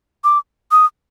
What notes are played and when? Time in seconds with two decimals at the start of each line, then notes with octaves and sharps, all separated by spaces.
0.24 D6
0.71 D#6